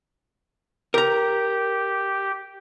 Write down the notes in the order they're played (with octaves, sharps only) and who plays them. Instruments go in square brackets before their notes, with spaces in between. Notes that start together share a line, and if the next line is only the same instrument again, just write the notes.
[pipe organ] G4 [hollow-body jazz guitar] A#4 A#5